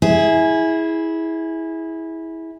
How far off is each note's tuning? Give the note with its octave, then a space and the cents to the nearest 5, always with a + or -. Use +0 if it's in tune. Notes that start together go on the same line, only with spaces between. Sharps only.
E4 -15 G#4 +0